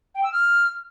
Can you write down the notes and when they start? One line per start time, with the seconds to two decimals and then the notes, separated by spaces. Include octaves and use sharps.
0.15 G5
0.23 E6
0.32 F6